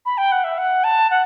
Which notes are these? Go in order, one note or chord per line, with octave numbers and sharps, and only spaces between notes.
B5
G5
F#5
E5
F#5
A5
F#5